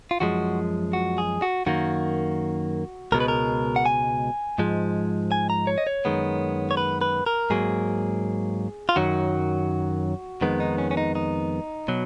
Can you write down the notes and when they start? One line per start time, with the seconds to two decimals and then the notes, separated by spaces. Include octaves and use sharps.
0.11 F4
0.20 F#2 F3 G#3 F#4
0.93 F#4
1.18 G#4
1.42 F#4
1.66 F#2 D#3 A#3 F#4
3.12 C#2 B2 G#3 A#4
3.20 B4
3.28 A#4
3.76 F#5
3.86 G#5
4.58 G#2 F3 G#3
5.32 G#5
5.50 A#5
5.67 C#5
5.78 D#5
5.87 C#5
6.05 F#2 D#3 G#3 B3
6.71 C#5
6.77 B4
7.01 B4
7.26 A#4
7.50 G#2 F#3 A#3 G#4
8.89 F4
8.96 F#2 D#3 F#3 F#4
10.41 F2 D#3 G#3 B3
10.60 D#4
10.78 C#4
10.91 C#4
10.97 D#4
11.15 D#4
11.88 B2 F#3